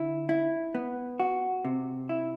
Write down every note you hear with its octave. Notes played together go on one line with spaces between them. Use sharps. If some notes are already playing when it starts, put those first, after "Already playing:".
Already playing: D3 E4
E4
B3
F#4
C3
E4